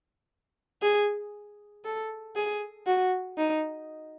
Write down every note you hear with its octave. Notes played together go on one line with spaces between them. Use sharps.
G#4
A4
G#4
F#4
D#4